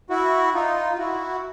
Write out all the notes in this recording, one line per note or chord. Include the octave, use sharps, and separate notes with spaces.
E4 F#4
D#4 F4
F4
E4 F#4